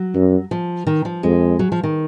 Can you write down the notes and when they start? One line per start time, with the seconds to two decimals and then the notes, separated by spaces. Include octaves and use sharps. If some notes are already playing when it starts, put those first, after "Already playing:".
Already playing: F#3
0.15 F#2
0.51 F3
0.87 D#3
1.05 F3
1.23 F2 G#3
1.59 F#3
1.72 F3
1.83 D#3